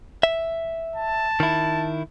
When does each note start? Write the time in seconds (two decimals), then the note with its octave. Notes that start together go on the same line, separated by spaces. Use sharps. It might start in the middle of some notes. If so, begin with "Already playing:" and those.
0.23 E5
0.95 A5
1.40 D#3 E4